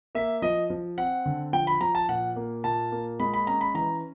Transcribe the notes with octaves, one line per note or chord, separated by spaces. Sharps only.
A#3 E5
F3 D#5
F3
C4 F#5
D3
F3 G5
B5
F3 A#5
A5
A#2 F#5
A#3
A#2 A5
A#3
G#3 B5
B5
C#4 A#5
B5
E3 A#5